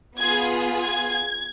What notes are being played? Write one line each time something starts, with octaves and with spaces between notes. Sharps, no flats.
B3 F4 G#4 G#6
G#6